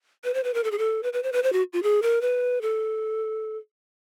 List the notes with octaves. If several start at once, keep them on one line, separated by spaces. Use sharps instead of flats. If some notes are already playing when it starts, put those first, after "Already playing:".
B4
C5
B4
A#4
A4
G#4
A4
B4
B4
C5
B4
C5
F#4
F4
G#4
A#4
B4
A4